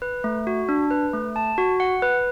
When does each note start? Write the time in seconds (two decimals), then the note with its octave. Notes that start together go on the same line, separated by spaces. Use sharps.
0.02 B4
0.24 A3
0.47 F#4
0.69 D4
0.91 B4
1.14 A3
1.36 A5
1.58 F#4
1.80 F#5
2.02 B4